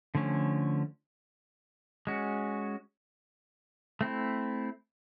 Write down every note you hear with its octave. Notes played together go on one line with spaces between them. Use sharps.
D3 F3 A3 C#4
G#3 C#4 F#4
A3 C4 E4